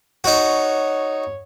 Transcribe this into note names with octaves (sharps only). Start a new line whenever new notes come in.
D#4 F#4 C#5